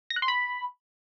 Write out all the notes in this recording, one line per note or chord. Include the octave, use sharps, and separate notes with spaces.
A#6
F#6
C6
B5